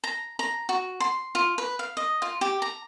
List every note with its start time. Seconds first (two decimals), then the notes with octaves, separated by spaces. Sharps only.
0.04 A#5
0.39 A#5
0.69 F#4
1.00 C6
1.35 F4
1.58 B4
1.79 F5
1.97 D#5
2.22 F4
2.41 G4
2.62 A#5